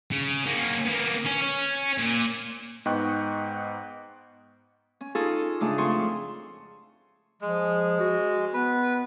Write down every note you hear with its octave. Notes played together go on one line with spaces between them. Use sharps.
C#3
A#3 C#4
A#3 B3
C#4
C#4
A#2
G#2 B3 D#5 G5 C#6 F#6
C#4
D#4 F4 G#4 A4 C#6
G#2 C#3 A3 D4
F2 G#4 A4 C6 C#6
F3 G#3
F#4
B3 B4